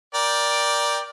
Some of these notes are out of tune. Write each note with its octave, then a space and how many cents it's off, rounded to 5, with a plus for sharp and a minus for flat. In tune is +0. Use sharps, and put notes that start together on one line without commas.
A#4 +20 D5 +0 G5 +0